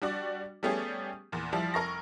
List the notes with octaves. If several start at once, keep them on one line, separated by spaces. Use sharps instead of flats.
G3 D4 F#4 D5
G3 A3 B3 C#4 G4 G#4
E2 A#2
F3 G3 E4
F1 A#4 C#6 A#6